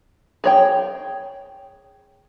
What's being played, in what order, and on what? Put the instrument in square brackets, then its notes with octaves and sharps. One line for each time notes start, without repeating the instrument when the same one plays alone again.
[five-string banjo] G#4 C#5 G5